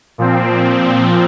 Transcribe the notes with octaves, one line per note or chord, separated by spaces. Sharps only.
A#2 F3 C4